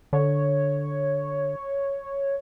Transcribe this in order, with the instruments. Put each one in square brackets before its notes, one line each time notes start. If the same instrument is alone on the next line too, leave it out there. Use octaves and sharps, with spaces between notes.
[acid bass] D3 [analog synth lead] C#5